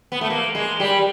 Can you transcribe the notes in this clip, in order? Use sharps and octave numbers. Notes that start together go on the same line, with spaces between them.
B3
A3
A#3
G#3
G3